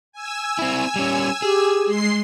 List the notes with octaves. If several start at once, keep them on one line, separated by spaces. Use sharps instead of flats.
G#5 E6
C4 E4
G3 C#4
G4 G#4
G#3 C6 C7